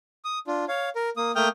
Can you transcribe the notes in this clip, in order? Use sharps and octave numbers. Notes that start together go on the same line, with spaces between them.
D#6
D4 F4
C#5 F5
A#4
A#3 D#6
A3 A#3 G5 D#6 F6 G6